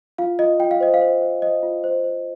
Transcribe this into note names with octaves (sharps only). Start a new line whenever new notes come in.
F4 F5
F4 D#5
F4 G5
F5
C5 D#5
F5
C5
C5
C5 D#5
F4
C5
C5